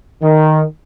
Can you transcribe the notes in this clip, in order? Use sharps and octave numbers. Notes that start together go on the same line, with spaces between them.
D#3